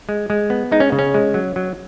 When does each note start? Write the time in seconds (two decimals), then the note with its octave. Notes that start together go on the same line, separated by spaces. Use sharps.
0.09 G#3
0.30 G#3
0.50 B3
0.71 G#3 D#4
0.80 C#4
0.92 C#3
0.99 C#4
1.14 G#3
1.34 F#3
1.56 F#3